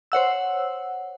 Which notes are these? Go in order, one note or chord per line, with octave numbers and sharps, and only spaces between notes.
C5 C#5 F#5 E6